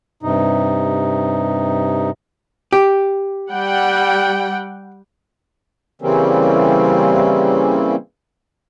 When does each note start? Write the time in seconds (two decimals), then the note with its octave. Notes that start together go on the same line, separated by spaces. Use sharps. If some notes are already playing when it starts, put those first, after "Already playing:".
0.23 G2 C3 D#4
2.73 G4
3.50 G3 F#5 G5
6.02 C#3 E3 G3 A#3 C4 C#4